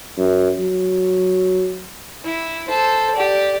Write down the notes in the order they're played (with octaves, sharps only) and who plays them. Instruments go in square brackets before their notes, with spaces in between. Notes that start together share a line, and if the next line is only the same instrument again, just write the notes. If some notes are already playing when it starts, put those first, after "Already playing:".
[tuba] F#2
F#3
[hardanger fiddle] E4
A4 C5
G4 D5